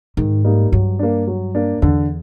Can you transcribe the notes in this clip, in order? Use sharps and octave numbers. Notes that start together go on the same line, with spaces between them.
G#2 D#3
G3 A#3 D#4
G2 F#3
A#3 D4
F#3
A#3 D4
E2 D3